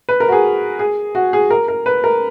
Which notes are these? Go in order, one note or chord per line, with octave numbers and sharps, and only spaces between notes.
B4
A#4
F#4
G#4
G#4
F#4
G#4
A#4
A#4
B4
A#4